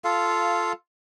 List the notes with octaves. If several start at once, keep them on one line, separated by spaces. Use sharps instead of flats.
F4 A4 F5